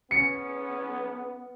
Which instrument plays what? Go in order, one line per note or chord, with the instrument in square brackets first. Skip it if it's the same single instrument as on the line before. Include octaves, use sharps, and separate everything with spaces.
[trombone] B3 [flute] C#4 [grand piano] C#7